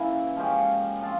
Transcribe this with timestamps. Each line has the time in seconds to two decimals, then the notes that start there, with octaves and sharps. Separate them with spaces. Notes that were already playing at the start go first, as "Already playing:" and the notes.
Already playing: C#3 E3 A#3 E4
0.36 F3 G#3 C#4 G4
1.02 F3 C4 F4